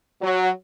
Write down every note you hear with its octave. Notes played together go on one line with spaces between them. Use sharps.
F#3